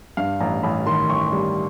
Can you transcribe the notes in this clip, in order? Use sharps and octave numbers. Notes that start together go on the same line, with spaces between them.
G2 F5
A1 A#5
A1 B5
D#3 C6
A1 C#6
G3